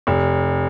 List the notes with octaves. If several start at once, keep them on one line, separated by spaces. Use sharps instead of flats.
F1